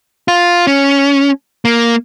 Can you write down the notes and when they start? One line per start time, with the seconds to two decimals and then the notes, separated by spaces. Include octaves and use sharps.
0.28 F4
0.67 C#4
1.65 A#3